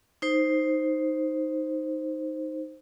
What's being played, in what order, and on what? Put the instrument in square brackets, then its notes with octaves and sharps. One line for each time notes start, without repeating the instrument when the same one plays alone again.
[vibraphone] D#4 C5